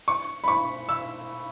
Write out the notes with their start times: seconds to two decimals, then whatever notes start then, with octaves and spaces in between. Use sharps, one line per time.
0.08 C#6
0.44 B5
0.48 C#6
0.89 E6